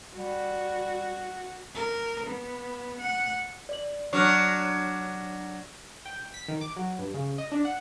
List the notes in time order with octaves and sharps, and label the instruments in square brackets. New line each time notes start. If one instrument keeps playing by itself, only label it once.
[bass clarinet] G3 [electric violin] F#4
[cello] A#4
B3
F#5
[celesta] D5 F#7
[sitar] F#3 D4 [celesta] C#6 F6 F#6
[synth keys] G5
B6
D#3
D6
F#3
G2
C#3
D#5
D4
F#5